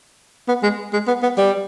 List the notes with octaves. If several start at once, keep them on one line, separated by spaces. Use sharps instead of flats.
B3
G#3
G#3
B3
B3
G3